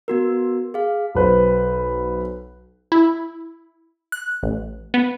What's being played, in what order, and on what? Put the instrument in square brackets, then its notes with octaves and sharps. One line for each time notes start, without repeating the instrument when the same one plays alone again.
[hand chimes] B3 F#4 A#4
G#4 F5
[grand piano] B1 B4 C5
[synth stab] E4
F#6
A1
B3